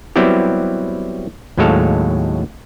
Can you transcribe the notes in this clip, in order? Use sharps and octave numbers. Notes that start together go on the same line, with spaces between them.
F#3 G3 B3 C4 E4 G4
D#2 A2 F#3 G#3 A4 F5